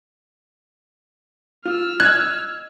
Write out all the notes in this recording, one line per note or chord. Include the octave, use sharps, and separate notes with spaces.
F4 E6 F6
D#5 F#6 G#6